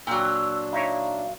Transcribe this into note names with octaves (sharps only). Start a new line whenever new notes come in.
A#2 F#3 D4 G5 E6
D#4 E4 C#5 F5